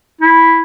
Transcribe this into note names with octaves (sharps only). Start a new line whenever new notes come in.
E4